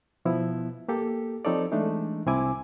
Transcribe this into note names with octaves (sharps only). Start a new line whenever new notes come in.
B2 F3 B3 E4
A#3 G4 A4
F3 C4 D#4 A4 C#5 D5
E3 G#3 A3 D4 D#4
C2 C4 E4 G#5 D6